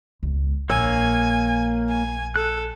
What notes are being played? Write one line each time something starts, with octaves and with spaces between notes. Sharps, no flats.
E1 C#2
A#1 A#3 C#5 G#5 E6
G#5
A4 F#6